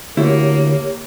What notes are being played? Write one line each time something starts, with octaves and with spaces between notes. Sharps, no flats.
D2 A#3 E4 G4 C#5